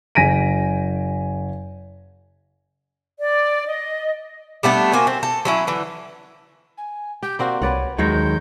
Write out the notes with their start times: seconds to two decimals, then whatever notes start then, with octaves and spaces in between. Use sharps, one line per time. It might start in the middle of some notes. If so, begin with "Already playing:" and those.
0.15 F#1 G#5 A#6 B6 D7 D#7
3.19 D5
3.66 D#5
4.63 G3 A3 B3 D4
4.93 A#3 C4 F#4 G#5
5.07 C4
5.23 A4
5.45 F#3 C#4 E4
5.67 D3 E3
6.77 G#5
7.23 G4 G6
7.39 A#3 C4 F#4 D5
7.62 C2 B4 C#5 D5 F#5
7.98 D#2 D#3 F#3 G#3 G6